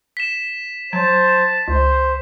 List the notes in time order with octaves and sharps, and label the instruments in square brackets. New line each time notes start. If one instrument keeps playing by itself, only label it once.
[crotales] B6 E7
[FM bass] F#3 [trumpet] C5 [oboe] A5
[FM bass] C#2 [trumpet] C5